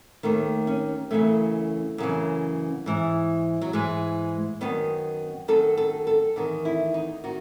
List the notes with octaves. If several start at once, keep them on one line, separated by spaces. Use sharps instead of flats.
D#2 D#3 A3
C#4
F#2 C#3 E3 A3
F#2 C#3 E3
G#2 E3
F#3
G#2 E3 G#3
F#2 D#3 B3
F#2 D#3 A4
A4
A4
E2 D#3
E4
D#4
D#3 F#4